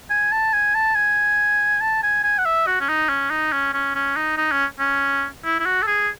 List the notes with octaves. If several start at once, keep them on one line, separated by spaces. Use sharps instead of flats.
G#5
A5
G#5
A5
G#5
A5
G#5
G#5
F#5
E5
F#4
C#4
D#4
C#4
D#4
C#4
C#4
C#4
D#4
D#4
C#4
C#4
E4
E4
F#4
A4
G#4